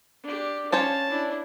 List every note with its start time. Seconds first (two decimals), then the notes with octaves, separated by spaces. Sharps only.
0.23 D4 G4
0.72 C#4 C5 C#5 F5 A5
1.09 D4 E4